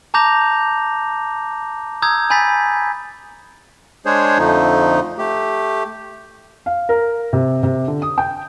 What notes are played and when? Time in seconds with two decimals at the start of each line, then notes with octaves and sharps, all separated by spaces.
0.14 A5 A#5 D6 G6 A#6 F7
2.02 A#5 D#6 E6 G6 G#6
2.30 G#5 B5 G6 A6 B6
4.06 G#3 D4 G#4 C5 C#5
4.38 F2 D3 F3 A3 D#4
5.18 A3 G4
6.66 F5
6.89 A#4
7.33 C3
7.63 C3
7.88 D3
8.02 D#6
8.18 G5